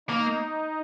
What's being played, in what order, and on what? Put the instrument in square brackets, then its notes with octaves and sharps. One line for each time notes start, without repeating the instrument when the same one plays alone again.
[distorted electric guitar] A#3 [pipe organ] D#4